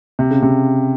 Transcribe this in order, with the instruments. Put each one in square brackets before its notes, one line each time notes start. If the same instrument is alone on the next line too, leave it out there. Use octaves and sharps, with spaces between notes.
[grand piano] C3
C#3
C3